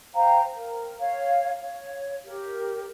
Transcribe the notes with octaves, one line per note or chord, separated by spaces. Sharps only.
C5 F5 G5 A#5
A#4
C#5 F5
C#5
G4 A#4